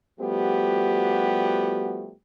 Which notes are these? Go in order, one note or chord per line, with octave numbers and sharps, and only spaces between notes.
F3 G3 A3 B3 F#4 G4